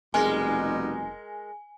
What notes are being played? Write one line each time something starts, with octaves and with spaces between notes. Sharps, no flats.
F1 B2 G3 G#3 D#4 A#4 G#5